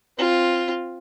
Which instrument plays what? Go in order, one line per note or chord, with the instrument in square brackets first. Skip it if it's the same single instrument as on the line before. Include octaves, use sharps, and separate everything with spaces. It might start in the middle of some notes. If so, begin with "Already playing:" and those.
[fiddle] C4 F4